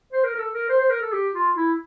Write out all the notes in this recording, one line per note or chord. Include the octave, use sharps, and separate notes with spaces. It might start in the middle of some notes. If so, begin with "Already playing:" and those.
C5
A#4
A#4
A4
A#4
C5
C5
A#4
A4
G4
F4
E4